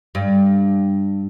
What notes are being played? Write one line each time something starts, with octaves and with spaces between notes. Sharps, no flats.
G2